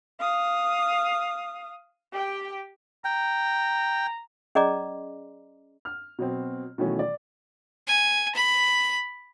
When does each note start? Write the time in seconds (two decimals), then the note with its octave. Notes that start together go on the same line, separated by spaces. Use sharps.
0.20 F5 D#6
2.13 G4 G5
3.05 G5 A#5
4.55 C#4 G#4 D5 D#5 A#5 D6
5.85 F6
6.19 B2 F#3 C4
6.78 B2 D#3 E3 F#3 A3 C#4
6.99 D5
7.87 G#5
8.35 B5